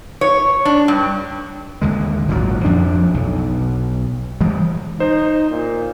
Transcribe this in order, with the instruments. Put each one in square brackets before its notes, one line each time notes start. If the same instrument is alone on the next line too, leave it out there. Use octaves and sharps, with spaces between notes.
[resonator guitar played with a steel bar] C#5
D4
G2
[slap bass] D#2 D3 G#3
G#1 A#2 D#3 F#3
F2 F3 D4
B1
E3 G3 G#3
[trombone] D#4 [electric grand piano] C5
[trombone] A#2